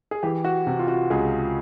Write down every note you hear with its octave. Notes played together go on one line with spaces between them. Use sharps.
G#4
E3 G4
F#4
C3
F4
F#4
C#2 G#4